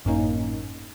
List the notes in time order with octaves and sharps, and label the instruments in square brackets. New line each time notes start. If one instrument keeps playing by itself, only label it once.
[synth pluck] G#1 F#2 A2 A#3 C#4 D#4